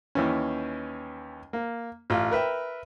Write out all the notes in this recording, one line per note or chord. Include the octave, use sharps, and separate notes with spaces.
D#2 E3 C#4
A#3
A1 F4
A#4 B4 E5 G5